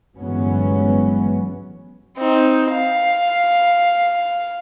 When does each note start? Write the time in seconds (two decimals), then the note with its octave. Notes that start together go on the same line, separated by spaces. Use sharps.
0.18 G1 E3 F#3 G#3 B3 C#4
2.18 C4 D#4
2.71 F5